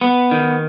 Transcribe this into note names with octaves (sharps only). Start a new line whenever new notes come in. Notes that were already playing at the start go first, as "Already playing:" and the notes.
B3
D#3